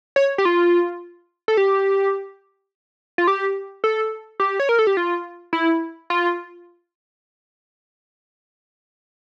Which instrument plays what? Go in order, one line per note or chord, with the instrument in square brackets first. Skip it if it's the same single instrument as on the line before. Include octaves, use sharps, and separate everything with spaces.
[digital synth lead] C#5
G4
F4
A4
G4
F4
G4
A4
G4
C#5
A#4
A4
G4
F4
E4
F4